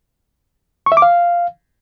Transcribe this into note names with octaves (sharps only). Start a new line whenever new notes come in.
C#6
E5
D6
F5